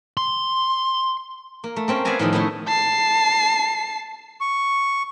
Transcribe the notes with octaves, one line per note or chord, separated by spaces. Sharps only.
C6
A#3
A3
A#3 C4 C#4
B3 D5 E5 F5 G#5 A#5
A2 D#3 F3 G#4
A3 B3 C#4 D#4 E4
A5 C7
C#6